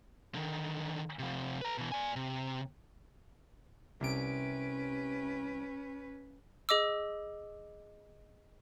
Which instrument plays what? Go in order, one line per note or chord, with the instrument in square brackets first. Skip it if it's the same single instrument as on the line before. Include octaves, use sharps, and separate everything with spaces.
[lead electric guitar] D3 D#3
C3 F3
B4 A#5
B2 E3
D5 G#5
C3
[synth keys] C2 C3 D7 [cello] C#4 B4
[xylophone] G#4 D#5 D6 E6